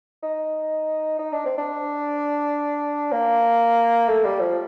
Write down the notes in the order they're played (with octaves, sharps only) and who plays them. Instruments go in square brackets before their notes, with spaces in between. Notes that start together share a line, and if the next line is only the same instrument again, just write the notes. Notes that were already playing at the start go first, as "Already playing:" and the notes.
[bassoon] D#4
D#4
D4
C4
D4
A#3
A3
G3
F3